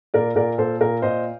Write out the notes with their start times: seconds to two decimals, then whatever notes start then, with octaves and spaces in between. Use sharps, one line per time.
0.14 A#2 A#4 D5
0.35 A#2 A#4 D5
0.58 A#2 A4 C5
0.81 A#2 A#4
1.02 A#2 C5 D#5